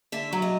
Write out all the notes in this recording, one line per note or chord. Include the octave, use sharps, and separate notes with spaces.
D3 E5
F#3
D#5